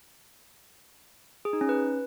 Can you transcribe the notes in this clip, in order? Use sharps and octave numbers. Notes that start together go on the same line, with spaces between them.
G#4
D#4
C#4
B4